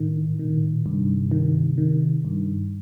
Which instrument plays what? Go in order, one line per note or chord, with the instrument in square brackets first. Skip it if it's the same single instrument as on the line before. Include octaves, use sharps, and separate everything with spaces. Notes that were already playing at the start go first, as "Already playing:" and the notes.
Already playing: [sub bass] A2 [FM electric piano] D#3
[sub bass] B2 [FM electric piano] D#3
[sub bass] A#2
A2
A#2
[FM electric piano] G2 [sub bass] C3
[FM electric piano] D#3
D#3
G2